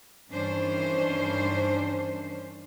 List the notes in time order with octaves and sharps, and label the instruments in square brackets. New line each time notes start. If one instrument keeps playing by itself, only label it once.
[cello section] G2 D#3 E3 C#4 D4 C5